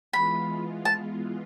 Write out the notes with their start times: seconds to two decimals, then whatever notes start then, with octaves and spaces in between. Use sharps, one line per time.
0.13 E3 G#3 B3 F4 B5
0.85 A5